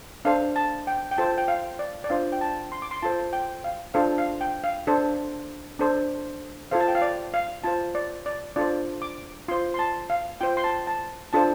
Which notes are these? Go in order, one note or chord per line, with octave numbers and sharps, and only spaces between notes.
D4 A4 C5 F5
A5
G5
G5
F4 A4 C5 A5
G5
F5
D5
D5
D4 F4 C5 F5
G5
A5
C6
D6
C6
F4 A4 C5 A5
G5
F5
D4 F4 A4 C5 F5
F5
G5
F5
D4 A4 C5
D4 A4 C5
F4 A4 C5 F5
A5
G5
F5
D5
F5
F4 C5 A5
D5
D5
D4 F4 A4 C5 D5
D6
F4 C5 C6
C6
A5
F5
F4 C5 G5
C6
A5
A5
D4 F4 A4 C5 A5